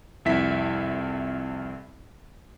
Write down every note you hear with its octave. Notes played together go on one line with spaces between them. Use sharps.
C2 F2 E4 E5 B6